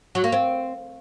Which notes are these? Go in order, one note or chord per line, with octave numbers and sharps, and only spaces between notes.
F#3
A#3
C4